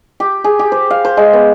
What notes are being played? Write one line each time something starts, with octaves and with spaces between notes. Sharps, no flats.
G4
G#4
G4
C5
F5
C5
G#3
B3